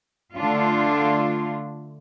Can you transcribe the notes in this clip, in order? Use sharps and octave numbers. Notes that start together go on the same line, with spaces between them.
D3 A3 D4 F4